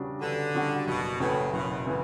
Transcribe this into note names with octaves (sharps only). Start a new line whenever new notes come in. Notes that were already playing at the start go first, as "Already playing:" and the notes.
Already playing: E2 C#3 G3 D4 F#4
E2 D3
C#3 G3 D4 F#4
F#1 B2
E2 A2 C#3 E3
F#1 B2
A2 C#3 E3